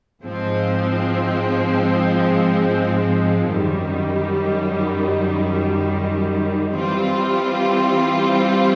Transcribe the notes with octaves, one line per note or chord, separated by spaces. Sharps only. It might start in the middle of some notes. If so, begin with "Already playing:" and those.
G#2 F3 G#3 C4
F#2 D#3 G3
E3 G3 C4 F4